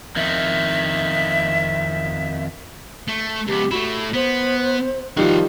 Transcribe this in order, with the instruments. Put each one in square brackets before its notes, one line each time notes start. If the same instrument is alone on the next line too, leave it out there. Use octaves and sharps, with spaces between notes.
[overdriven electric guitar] F2 D#3 [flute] E5
[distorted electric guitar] A3
[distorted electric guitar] C#2 B3 [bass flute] G4
[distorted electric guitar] A3 E4 [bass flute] F#4
[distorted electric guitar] B3 [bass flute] C5
[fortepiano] D#3 G3 [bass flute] F3 [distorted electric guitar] F#4 F5